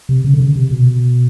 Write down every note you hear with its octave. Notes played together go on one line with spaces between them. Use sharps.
C3
C#3
D3
C#3
C3
B2